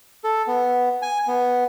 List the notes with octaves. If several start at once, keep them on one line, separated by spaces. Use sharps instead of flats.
A4
B3
G#5
B3